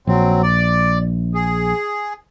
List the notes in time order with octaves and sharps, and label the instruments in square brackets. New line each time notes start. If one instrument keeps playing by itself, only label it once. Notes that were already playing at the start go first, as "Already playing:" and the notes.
[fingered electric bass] A#1 [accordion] F#3 C4
[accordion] D5
G#4